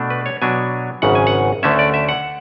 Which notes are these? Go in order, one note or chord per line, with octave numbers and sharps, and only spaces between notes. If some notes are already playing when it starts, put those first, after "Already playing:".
Already playing: B2 A3 D4
B4
C#5
B2 F#3 B3 D4 G#5
G#1 F#2 C#3 F#5
G#5
F#5
D2 D3 A3 C#4 E5
D5
E5
F#5